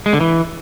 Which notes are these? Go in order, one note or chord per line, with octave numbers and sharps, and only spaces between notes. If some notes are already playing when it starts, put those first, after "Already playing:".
G#3
D3
E3